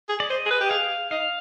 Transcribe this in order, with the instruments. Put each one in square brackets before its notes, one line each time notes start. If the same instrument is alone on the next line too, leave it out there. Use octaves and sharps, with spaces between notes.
[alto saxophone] G#4
[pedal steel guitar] D5
[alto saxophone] C5 [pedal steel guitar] D#5
[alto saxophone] G#4
B4
G4
[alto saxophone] G#4 [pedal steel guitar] F5
[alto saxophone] D#4 [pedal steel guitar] F5